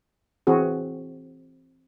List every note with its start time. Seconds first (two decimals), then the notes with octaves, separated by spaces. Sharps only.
0.47 E3 C4 F#4 G#4